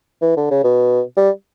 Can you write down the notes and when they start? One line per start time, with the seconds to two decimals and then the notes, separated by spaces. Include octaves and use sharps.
0.22 E3
0.37 D3
0.51 C#3
0.64 B2
1.17 G3